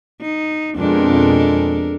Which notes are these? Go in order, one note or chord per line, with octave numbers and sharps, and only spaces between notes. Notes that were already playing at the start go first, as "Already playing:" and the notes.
D#4
F2 B2 G#3 D4 A4 A#4